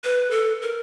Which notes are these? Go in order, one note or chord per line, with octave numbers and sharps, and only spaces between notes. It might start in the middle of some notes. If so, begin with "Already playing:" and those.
B4
A4
A#4